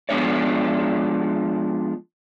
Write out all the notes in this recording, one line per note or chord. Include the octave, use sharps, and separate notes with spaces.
F3 G#3 B3 D4 C#5 D5